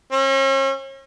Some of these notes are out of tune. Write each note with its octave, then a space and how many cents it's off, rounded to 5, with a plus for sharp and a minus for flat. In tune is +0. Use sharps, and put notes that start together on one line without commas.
C#4 -40